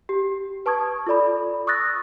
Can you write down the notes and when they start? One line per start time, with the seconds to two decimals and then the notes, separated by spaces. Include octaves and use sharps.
0.09 G4
0.66 B4 A5 C#6 D#6 G#6
1.07 F4 A4 D5 B5
1.67 C#6 D#6 E6 F#6 A6 A#6